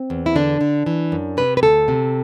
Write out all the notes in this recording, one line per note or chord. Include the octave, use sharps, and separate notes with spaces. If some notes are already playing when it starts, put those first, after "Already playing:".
Already playing: C4
E2
E4
D3 D4
D3
E3
F#2
C3 B4
B4
D2 A4
C3